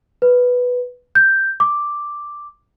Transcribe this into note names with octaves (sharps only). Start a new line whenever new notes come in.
B4
G6
D6